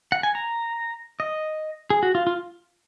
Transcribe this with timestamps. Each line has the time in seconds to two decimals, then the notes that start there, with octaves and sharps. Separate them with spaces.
0.12 F#5
0.23 G#5
0.35 A#5
1.20 D#5
1.90 G#4
2.03 F#4
2.15 F4
2.27 F4